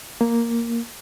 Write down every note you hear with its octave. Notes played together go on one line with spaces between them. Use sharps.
A#3